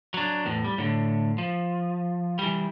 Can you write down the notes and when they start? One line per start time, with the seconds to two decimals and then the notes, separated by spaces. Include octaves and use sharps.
0.14 F#3 D4
0.45 E2 A2
0.64 G3
0.78 A2 D3
1.38 F3
2.39 E3 G3